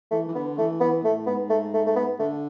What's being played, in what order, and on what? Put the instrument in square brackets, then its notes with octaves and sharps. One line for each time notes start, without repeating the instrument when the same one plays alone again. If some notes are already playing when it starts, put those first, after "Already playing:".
[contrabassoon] E3 [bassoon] A3
[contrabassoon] E3
[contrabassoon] D3 [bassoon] B3
[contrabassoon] E3 [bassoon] A3
[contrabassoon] E3 [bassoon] B3
[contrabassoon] A2 [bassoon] A3
[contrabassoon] G#2 [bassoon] B3
[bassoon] A3
A3
A3
B3
[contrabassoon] D3 [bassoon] A3